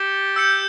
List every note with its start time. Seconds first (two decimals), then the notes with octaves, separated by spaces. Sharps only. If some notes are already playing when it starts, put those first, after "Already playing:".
Already playing: G4 A6 C#7 E7 G7
0.36 E6 G6 C#7